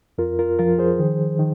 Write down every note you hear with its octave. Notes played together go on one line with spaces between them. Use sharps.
F2 F4 A#4
F4 A#4
F3 F4 A#4
G#4 C5
D#3
D#3